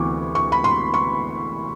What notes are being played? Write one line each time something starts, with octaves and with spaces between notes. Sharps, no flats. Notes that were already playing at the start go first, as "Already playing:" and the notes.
Already playing: D2 C3 E3 B3 C#6 D6
C#6
B5
C6
C#6